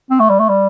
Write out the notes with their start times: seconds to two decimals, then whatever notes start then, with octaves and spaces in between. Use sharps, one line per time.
0.10 C4
0.20 A3
0.30 G3
0.39 A3
0.49 G3